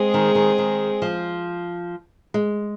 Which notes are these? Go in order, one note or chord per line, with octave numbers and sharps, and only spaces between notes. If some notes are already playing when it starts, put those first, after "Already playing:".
Already playing: G#3 C4 G#4
D#3
D#3
D#3
F3
G#3